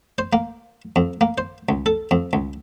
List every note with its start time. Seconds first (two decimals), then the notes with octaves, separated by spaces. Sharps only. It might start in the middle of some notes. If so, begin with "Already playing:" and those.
0.18 C5
0.33 A#3
0.96 F2
1.21 A#3
1.38 C5
1.69 C#2
1.86 A4
2.11 F2
2.33 C#2